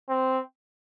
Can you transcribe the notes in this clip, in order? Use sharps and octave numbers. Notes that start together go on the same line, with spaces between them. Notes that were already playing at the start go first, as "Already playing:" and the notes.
C4